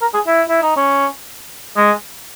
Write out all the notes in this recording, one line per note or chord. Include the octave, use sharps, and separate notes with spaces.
A#4
G#4
E4
E4
D#4
C#4
G#3